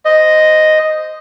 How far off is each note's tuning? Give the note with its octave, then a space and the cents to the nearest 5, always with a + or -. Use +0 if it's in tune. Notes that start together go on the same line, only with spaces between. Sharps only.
C5 -10 D#5 +0